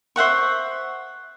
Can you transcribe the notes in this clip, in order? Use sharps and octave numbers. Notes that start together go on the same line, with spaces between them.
C5 E5 F#5 C#6